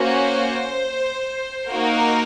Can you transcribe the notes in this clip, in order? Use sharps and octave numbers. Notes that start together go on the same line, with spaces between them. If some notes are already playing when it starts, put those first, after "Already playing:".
Already playing: A#3 C#4 F#4 C5
A#3 D#4 F#4 A#4